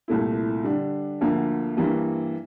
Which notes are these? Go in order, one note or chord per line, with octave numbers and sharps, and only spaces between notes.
C2 A#2 A3 E4
D3 G3 D4
D2 D3 F3 A#3
G2 E3 G3 A#3